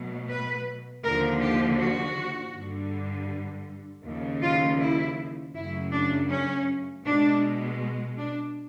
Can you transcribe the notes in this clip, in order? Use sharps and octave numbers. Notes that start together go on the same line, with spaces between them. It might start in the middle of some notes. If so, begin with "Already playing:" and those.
Already playing: B2 F#3 A3
B4
D#2 D3 F3 A#4
G4
F#4
G2 D3 G3
D#2 C#3 F3
F4
E4
F#2 C#3 F#3 A3 E4
D4
C#4
B2 G#3 D4
D4